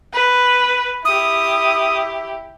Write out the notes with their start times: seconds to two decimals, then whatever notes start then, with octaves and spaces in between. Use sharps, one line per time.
0.14 B4
1.05 E4 G4 D#6